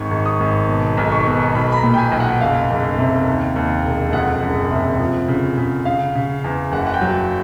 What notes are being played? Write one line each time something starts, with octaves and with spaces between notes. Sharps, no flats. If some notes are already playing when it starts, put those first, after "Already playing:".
Already playing: G#1 C#6
G#1
D#6
G#1
B2
B1
C#6
B2
B1 B5
B5
A#5
A#2
G5
G#5
B1
F#5
F#1 F5
F#1
C3
D#2
D#2
E1
F2 F#5
F#1
C3
F3
C#3
C#3
C#3 F5
C#3
E2
F#1 F#5
F#5
G5
F#3